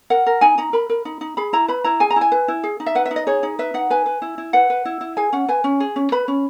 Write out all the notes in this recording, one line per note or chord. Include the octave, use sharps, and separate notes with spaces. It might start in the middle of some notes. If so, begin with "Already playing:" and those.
A#4 F#5
A#4
D#4 G#5
D#4 A#5
A#4 B5
A#4
D#4
D#4
G#4 B5
E4 A#5
B4 B5
E4 A#5
G#4 G#5
A#5
E4
G#5
B4
E4
G#4
D#4
E5
B4 F#5
E5
D#4
D#5
G#4 C#5
D#4
B4 E5
D#4 F#5
B4 G#5
B4
E4
E4
B4 F#5
B4
E4
E4
G#4 G#5
C#4 F#5
B4 G#5
C#4
G#4
C#4
B4 B5
C#4